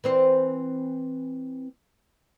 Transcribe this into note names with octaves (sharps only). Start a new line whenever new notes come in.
E3 C4 C5